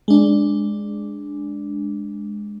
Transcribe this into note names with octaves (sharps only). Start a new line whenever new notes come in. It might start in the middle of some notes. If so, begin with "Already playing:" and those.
G#3 D4